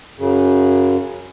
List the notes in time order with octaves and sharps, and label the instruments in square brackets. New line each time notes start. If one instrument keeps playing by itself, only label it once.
[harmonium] F#2 C#3